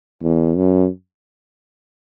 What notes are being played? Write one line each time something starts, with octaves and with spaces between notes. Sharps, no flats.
E2
F#2